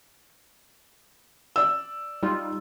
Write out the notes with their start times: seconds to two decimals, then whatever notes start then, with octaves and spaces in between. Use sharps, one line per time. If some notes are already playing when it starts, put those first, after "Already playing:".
1.56 D5 E6
2.23 G3 D#4 F4